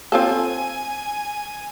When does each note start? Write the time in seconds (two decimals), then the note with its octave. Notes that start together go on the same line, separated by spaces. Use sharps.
0.12 C4 F4 A4 G#5